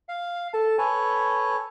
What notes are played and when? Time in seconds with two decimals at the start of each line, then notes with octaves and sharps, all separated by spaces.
0.09 F5
0.53 A4 A5
0.78 A4 B4 C#5 G#5